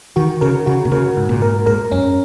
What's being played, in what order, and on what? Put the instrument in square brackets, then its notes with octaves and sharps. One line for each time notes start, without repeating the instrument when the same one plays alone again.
[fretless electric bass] D#3 [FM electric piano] F#4
[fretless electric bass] C#3 [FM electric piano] A#4
[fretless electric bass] C#3 [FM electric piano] F#4
[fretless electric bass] A#2
[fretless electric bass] C#3 [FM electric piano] A#4
[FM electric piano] G#2
[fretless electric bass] A#2
[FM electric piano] A#4
[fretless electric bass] G#2 [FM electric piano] A#4
[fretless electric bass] F#2 [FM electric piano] C#4